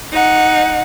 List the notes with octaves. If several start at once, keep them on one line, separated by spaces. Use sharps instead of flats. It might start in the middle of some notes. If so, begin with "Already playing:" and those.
D#4 F#5